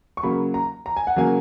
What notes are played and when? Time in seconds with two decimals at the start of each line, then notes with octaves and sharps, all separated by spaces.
0.17 C#6
0.23 C#3 F#3 A#3 B5
0.54 A#5
0.86 A#5
0.96 G#5
1.07 F#5
1.16 C#3 F#3 A#3 G#5